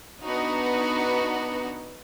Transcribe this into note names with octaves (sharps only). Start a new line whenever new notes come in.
B3 D4 D#4 F#4